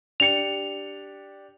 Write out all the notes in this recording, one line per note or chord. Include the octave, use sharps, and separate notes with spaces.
D4 G4 C#7 F7